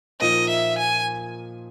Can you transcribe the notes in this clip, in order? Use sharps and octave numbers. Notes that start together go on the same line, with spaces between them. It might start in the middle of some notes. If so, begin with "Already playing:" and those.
A#2 F3 A#3 D#4 D#5
E5
G#5